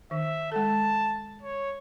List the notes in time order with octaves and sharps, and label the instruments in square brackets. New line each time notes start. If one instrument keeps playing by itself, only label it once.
[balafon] D#3 [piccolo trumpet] E5
[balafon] G#3 A4 [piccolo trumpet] A5
[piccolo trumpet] C#5